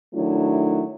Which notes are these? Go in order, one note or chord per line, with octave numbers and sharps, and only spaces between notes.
D#3 F#3 A3 D4 E4